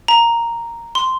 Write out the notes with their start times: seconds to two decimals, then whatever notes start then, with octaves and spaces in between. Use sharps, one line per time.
0.08 A#5
0.95 C6